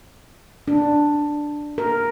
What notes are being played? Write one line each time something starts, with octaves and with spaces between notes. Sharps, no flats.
D4
A#4